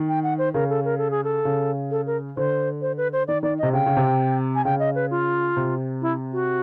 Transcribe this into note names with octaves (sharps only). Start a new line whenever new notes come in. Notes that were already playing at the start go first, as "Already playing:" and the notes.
Already playing: D#3
G5
F#5
C5
C#3 A#4
A4
A#4
A4
G#4
A4
C#3
A4
A#4
D3 C5
C5
B4
C5
D#3 D5
D#3 D5
C3 D#5
C#3 G5
C#3
C3
G#5
C#3 G5
D#5
B4
F4
C3
E4
F#4